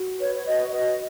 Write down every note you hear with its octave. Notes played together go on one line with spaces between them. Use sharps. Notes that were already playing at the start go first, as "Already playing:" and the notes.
Already playing: F#4
B4 C#5
C#5
F#4 D#5
B4 D#5